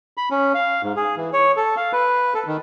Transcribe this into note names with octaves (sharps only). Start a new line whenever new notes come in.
B5
C#4
F5
G#2
G#4
E3
C#5
A4
F5
B4
A4
D#3